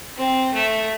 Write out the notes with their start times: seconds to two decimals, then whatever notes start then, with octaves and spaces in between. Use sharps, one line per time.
0.17 C4
0.53 A3